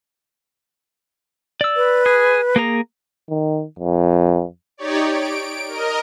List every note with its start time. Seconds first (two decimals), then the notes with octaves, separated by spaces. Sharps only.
1.61 D5 E6
1.76 B4
2.06 G#4
2.56 A#3 G#4 A#5
3.29 D#3
3.79 F2
4.77 D#4 G4 C#5 D5
5.11 D7
5.68 A#4 D#5